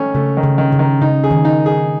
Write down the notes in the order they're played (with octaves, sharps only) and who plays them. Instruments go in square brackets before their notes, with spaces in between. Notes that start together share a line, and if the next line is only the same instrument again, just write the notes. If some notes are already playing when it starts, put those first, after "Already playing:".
Already playing: [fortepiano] D#3 A3 C#4
[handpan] C#3 [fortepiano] A3
[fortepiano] D#3
[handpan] C#3
[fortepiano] D#3
[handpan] C#3
[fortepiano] D#3
[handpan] C#3 [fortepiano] D#4
[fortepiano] G#4
[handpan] D#3
[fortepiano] D#4
G#4